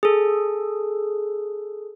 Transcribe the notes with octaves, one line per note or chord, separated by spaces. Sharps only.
G#4 A4